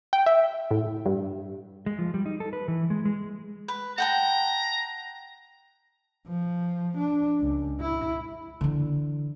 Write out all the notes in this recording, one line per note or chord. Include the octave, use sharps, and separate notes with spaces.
G5
E5
A2
G2
G#3
F3
G3
D#4
A4
B4
E3
G#3
G#3
B4
F#5 G5 A5 A#5
F3
D4
C#2
E4
D3 E3